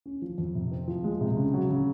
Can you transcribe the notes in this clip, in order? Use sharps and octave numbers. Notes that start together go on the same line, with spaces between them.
C#4
F3
F2
C3
C4
F3
G#3
C3
C#3
F#3
C#3